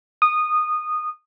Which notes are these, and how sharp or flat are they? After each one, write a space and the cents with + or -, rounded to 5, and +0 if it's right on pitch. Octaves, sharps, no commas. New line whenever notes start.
D#6 -15